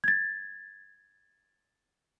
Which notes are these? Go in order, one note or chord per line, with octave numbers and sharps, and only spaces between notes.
G#6 A6